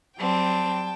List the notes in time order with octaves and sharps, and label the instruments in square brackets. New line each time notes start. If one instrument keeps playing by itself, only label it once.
[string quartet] F#3 G3 C4 [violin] G5 A5